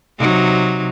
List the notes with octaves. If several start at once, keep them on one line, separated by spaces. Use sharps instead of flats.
C3 F#3 D#4